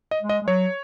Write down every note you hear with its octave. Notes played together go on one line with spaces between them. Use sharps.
D#5
G#3
D#5
G#3
F#3 C#5